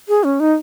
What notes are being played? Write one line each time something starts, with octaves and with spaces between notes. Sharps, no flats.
G#4
C#4
D#4